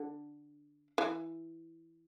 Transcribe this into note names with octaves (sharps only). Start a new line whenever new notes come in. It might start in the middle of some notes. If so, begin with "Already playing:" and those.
Already playing: D3
E3